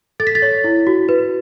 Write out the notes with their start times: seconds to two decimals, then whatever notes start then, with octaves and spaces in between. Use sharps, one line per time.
0.20 A4 A6
0.27 B6
0.35 A6
0.42 C#5
0.64 E4
0.87 F#4
1.09 B4